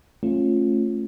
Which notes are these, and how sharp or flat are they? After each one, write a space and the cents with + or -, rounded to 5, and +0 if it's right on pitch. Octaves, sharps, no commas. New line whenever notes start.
A3 +0 C#4 -30 F4 +0